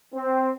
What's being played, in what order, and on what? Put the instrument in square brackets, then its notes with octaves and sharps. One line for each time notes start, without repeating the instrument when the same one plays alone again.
[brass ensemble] C4